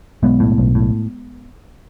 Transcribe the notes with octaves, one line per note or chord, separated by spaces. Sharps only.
B1 G#3 B3
A2
B1
A2